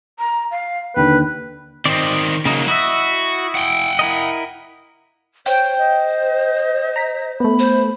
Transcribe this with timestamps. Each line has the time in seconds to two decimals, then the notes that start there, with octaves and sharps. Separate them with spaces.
0.19 A#5
0.51 F5
0.96 D#2 D3 B4 G5
1.86 D#3 C4 D5 D#5
2.45 C#3 F#3 A#3 D#4
2.68 E4 F#4 D#5 E5
3.55 F#5 G5
3.99 E4 A#4 D#5
5.46 C5 C#5 G5
5.78 D#5
6.96 A#5 B6
7.40 A3 B3 B5
7.59 C5